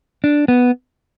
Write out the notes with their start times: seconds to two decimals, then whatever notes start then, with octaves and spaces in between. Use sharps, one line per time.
0.24 D4
0.48 B3